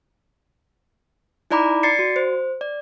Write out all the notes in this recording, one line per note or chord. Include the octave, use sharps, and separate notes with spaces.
D#4 E4 D5 A#5 B5 D6
D5 A6 C7 C#7
F#4
C5
D5